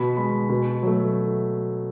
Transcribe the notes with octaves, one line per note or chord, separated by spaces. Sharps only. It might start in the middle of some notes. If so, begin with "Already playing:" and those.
Already playing: B2 B5
G#3 B5
B2
F#3 A3